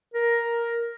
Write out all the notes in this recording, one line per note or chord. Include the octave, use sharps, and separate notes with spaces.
A#4